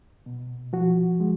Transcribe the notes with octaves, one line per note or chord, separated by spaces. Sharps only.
B2
F3 F#4
G#3